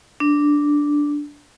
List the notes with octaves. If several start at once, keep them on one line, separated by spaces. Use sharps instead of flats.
D4